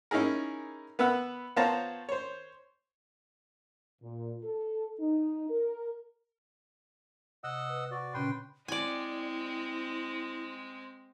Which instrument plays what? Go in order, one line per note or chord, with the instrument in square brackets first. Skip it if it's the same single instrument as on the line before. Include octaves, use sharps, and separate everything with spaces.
[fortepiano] C#4 D#4 E4 G#4 A#4
B3 B4 E5 F#5
B3 F4 C5 C#5 A5 A#5
C5 C#5
[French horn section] A#2
A4
D#4
A#4
[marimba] C3 [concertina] D#5 F#5 E6
[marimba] B4
[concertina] F#4 D5
[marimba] A#2 C#3 C#4 [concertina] B4 G5 C6
[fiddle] G#3 C4 [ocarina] E4 [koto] D5 G#5